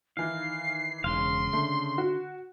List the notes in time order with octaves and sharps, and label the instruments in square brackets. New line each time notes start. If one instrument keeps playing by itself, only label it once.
[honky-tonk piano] D#3 E3 [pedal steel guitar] F5 [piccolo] C7
[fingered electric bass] E1 [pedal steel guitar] C#3 F5 [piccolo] C6
[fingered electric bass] D3 [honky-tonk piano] A3
[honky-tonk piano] F#4